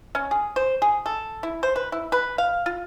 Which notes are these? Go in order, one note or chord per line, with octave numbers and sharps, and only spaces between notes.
C#4
G#4
C5
G#4
A4
E4
C5
B4
E4
B4
F5
F4